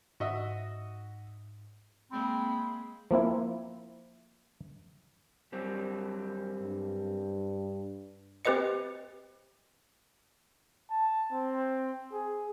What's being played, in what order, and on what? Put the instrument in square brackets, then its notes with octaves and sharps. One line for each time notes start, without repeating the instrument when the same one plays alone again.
[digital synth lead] G#2 [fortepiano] F#4 D#5 E5
[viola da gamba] G#3 A#3 [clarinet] C4 [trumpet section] B5
[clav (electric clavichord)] F3 A#3 C4 E4
[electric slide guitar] F#2 G3 C4
[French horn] G2
[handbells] C4 G4 B4 C5 D#5 C#7
[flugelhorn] A5
C4
G#4